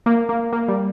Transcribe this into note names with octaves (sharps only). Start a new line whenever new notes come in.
A#3
A#3
A#3
G3